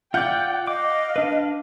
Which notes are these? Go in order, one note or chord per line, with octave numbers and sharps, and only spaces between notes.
F4 D5 F#5 G5 G6
D#5 F5 D6
D4 B4